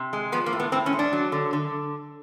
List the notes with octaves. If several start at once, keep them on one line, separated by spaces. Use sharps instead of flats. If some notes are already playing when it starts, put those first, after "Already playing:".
Already playing: C3
G#3
F3 B3
A#3
A2
B3
A2 C4
C#4
G#3
D4
F#3
D3
D3